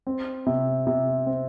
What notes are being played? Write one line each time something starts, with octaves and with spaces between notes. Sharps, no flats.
C4
C3
C3
C4